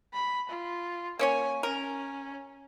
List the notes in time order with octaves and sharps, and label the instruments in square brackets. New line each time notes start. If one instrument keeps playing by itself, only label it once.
[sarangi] B5
F4
[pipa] A#3 C#4 C#5 [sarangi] G#5
[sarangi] C#4 [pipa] A#4